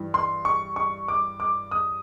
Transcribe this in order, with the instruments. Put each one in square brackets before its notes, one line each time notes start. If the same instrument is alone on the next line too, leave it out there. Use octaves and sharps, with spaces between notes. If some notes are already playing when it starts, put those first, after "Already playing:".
Already playing: [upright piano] G2 E3
C6
C#6
C#6
D6
D6
D#6